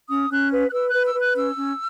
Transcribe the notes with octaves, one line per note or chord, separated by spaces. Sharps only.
C#4 D#6
C#4 F#6
B4
F#6
B4 E6
B4 F#6
E6
B4
F#6
C#4 E6
C#4